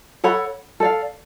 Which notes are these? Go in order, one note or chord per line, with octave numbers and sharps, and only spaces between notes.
A4 C#5 F#5 B5
A4 D5 F5